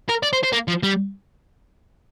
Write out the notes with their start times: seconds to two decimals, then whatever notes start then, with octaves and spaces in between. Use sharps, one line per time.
0.09 A#4
0.23 D5
0.33 C5
0.44 C5
0.53 A#3
0.68 F3
0.83 G3